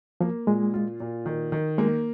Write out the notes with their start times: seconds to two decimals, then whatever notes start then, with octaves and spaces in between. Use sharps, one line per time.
0.21 F3 A#3
0.47 A#2 G#3
0.74 F4
1.00 A#2
1.26 D#3
1.52 D#3
1.78 G#3 A#3